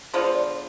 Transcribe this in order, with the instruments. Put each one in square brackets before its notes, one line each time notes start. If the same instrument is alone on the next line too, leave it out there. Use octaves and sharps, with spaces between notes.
[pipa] D3 G#3 B3 F4 [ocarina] C5
[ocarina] C5
D5